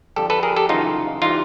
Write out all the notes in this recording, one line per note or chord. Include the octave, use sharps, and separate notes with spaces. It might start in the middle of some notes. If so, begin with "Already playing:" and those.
F2 D3 G3 G4 A4
A4 B4
G#4 A#4
G4 A4
F#2 C#3 E3 D#4 F4
E3 G3 D#4 F4